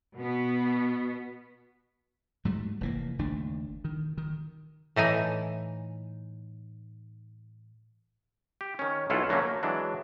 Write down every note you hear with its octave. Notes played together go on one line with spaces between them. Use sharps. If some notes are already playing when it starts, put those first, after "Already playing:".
B2 B3
G#2 F#3 G3 A3
F1 E3 A#3
F#1 D#2 A3 D4
D#3
D#3
A2 E3 D#4 G#5
G4
D#3 C#4
B1 C#4 E4 F4 A4 F#5
D3 F#3 A3 A#3 C#4
A#3
E3 F#3 G#3 D4